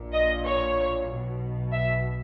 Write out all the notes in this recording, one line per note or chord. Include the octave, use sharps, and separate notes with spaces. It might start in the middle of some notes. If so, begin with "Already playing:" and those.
Already playing: A#1 A#2
D#5
C#5
B1 B2
E5